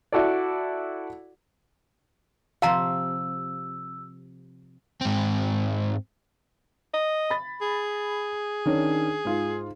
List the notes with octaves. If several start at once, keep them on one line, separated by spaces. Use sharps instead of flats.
E4 F#4 A4 D5
C3 F3 F4 F5 A#5 E6
G#2 C4
D#5
B5 A6
G#4
D#3 C#4 D4
G#2 F4